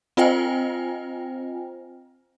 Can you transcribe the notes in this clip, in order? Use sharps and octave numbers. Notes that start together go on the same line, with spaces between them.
C4 F4 C5 D#5 G5 G#5